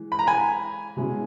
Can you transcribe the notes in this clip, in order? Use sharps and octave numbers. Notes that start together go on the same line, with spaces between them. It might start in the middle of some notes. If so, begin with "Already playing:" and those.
Already playing: E3 G#3
B5
A#5
G#5 B5
B2 G#3 C#4 E4